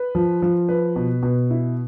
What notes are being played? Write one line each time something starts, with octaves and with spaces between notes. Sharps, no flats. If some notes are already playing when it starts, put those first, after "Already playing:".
Already playing: B4
F3
F3
B4
B2
B2
E4